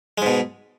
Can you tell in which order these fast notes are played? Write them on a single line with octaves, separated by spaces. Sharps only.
G#3 G#2 B2